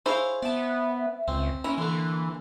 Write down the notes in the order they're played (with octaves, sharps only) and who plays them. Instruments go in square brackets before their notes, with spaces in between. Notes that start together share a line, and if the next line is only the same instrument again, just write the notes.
[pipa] E4 C5 [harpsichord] G#4 C#5 F5
[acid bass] B3 [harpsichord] D5 A5 [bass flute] E5
[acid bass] C#2 [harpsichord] C4
[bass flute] A#3 [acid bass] C#4 [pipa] E4 [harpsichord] A#5
[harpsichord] D3 A3 [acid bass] E3